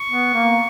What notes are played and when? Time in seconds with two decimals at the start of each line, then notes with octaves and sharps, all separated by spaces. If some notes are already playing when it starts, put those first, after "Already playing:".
Already playing: C#6
0.09 B3
0.34 A#3